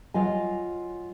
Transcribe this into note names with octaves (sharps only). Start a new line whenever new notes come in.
F#3 F4 D#5 G#5